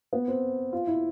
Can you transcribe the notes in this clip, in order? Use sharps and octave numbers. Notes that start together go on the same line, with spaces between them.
B3
C4
F4
E4